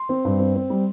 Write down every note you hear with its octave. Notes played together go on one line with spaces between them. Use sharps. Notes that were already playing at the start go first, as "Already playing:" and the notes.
Already playing: C6
C4
G2
C4
C4
G3